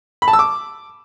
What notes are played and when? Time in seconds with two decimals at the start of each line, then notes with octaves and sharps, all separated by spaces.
0.22 B5
0.28 A5
0.33 E6
0.39 D6